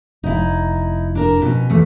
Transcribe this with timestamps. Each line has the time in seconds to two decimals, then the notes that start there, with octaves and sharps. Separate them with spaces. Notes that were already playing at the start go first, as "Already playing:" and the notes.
0.24 F1 D#4 E4
1.15 D4 A#4
1.42 B2 C#4
1.70 E2 A3